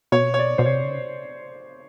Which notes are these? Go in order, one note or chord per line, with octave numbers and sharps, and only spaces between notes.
B2 C#5
C#5
D5
B2 C5
C3 C#5
C#3